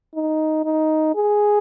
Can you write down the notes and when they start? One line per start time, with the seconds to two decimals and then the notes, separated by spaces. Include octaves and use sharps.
0.15 D#4
0.65 D#4
1.16 G#4